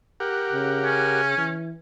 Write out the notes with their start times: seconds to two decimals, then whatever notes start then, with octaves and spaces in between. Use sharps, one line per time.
0.20 G4 A#4 F#5
0.52 C#3
0.84 C#4
1.38 E3